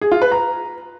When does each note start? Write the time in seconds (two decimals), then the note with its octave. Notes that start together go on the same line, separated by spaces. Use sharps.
0.01 G#4
0.12 F4
0.22 B4
0.32 A#5